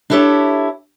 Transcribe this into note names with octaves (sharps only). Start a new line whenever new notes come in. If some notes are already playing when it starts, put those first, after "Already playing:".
D4 E4 G4 A4 C5 C#5